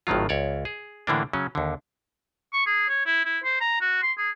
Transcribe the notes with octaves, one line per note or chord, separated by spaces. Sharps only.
G#1 A2 D#3 F#3 F4
C#2 C#5 D5
G#4
A2 D3 E3 A#3 D4
C#3 F#3 C#4
D#2 D3
C#6
G#4
C#5
E4
E4
C5
A#5
F#4
C6
G#4